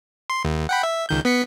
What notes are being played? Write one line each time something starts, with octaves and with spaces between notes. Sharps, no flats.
C6
D#2
F#5 G5 B5
E5
C#2 D#3 G6
B3 B6 C#7